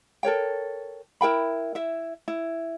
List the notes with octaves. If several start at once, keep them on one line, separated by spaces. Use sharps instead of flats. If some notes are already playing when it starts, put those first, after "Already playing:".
A4 A#4 C#5 G5
E4 A#4 G5 B5
E4 E5
E4